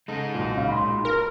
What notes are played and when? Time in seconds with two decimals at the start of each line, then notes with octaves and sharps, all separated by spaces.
0.08 C#3 G#3 D#4 A4
0.35 B1 A#2
0.56 C#2 C#4 F5
0.68 B5 C6
1.05 A#4